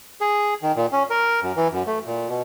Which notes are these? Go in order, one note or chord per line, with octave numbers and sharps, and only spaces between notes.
G#4
D#3
A#2
C#4
A#4
F#2
E3
F#2
A3
A#2
B2